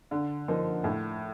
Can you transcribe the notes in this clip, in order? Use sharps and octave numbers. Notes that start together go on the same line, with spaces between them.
D3
F3 A#3 D#4
A2